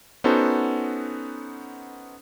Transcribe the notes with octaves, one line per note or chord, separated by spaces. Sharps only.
B3 C#4 D#4 F#4 A4 C5